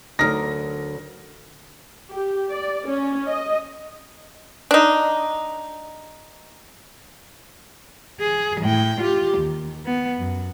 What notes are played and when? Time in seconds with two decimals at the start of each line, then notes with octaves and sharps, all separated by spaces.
0.19 D2 D3 F#3 D#4 A#4 A#6
2.10 G4
2.50 D5
2.88 C#4
3.28 D#5
4.71 D4 D#4
8.20 G#4
8.61 A2 G5
9.01 F4 G4
9.38 D#2
9.86 B3
10.18 F#2